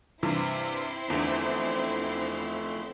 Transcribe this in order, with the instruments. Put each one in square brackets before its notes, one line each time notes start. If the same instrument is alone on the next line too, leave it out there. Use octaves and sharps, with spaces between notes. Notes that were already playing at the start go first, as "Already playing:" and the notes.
[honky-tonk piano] G2 C3 E3 [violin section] C4 E4 C6
[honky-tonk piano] E2 D3 [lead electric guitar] F3 A3